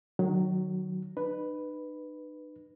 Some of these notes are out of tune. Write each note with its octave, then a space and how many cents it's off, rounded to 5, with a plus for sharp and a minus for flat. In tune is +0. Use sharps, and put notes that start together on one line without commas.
D#3 -35 F#3 +0
D#4 -45 B4 +0